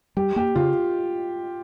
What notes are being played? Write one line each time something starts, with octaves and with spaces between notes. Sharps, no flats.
G3 G4
A#3 G4
C#3 F4